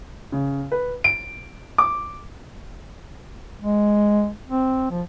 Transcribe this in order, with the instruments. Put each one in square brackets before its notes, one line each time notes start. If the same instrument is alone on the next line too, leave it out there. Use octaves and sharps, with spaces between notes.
[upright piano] C#3
B4
D7
D6
[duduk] G#3
C4
F3